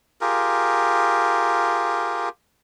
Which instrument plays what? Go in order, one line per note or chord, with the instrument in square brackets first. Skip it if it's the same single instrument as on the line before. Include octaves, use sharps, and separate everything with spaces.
[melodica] F4 G4 G#4 A#4